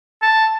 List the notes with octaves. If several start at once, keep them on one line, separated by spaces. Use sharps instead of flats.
A5